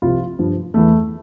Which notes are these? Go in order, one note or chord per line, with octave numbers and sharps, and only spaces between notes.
C2 C3 F3 F4
G2 F3
E2 E3 A3